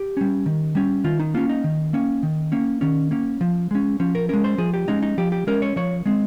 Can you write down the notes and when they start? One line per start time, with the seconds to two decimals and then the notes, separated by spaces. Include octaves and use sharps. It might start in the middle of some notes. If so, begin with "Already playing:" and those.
Already playing: G4
0.17 G3 C#4
0.46 D#3
0.75 G3 C#4
1.04 D#3 F4
1.20 D#4
1.34 A#3 C#4 F4
1.49 D#4
1.64 D#3
1.93 A#3 C#4
2.23 D#3
2.52 A#3 C#4
2.81 D#3 C#4
3.11 A#3 C#4
3.41 F3
3.71 G#3 C#4
4.00 F3 C#4
4.15 A#4
4.29 G#3 C#4 A#4
4.44 C5
4.58 F3 G#4
4.74 G4
4.88 G#3 C#4 D#4
5.03 D#4
5.18 F3 G4
5.32 G4
5.47 G#3 C#4 A#4
5.62 C#5
5.76 F3 C#5
6.06 G#3 C4